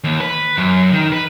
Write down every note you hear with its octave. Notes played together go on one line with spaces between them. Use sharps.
D#2
B4
F#2
D#3
B4